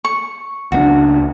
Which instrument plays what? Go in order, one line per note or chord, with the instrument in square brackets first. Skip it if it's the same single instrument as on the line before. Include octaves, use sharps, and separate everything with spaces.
[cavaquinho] C#6
[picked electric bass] C#2 A3 D4 [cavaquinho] F#4